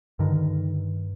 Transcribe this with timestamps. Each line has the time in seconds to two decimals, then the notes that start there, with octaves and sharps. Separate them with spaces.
0.19 G2 D3 D#3